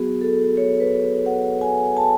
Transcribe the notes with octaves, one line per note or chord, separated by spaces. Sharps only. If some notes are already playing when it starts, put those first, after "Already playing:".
Already playing: F#3 B3 F#4 G#4
A4
C#5
B4
C#5
F#5
G#5
A5